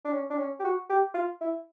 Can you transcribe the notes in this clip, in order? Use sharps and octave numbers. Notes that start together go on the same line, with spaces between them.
D4
C#4
D4
C#4
G4
F#4
G4
F4
E4